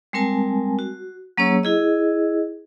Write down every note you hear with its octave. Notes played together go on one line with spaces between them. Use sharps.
G3 G#3 C4 A#4 G#5 A5
F#4
F#3 A#3 C#4 G#4 C#5 E6
E4 G#4 D#5